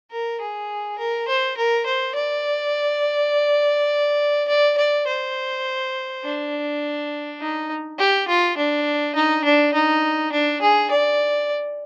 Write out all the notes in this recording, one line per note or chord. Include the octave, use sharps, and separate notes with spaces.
A#4
G#4
A#4
C5
A#4
C5
D5
D5
D5
C5
D4
D#4
G4
F4
D4
D#4
D4
D#4
D4
G#4
D5